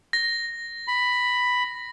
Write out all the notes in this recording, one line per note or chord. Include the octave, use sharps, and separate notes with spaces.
A#6
B5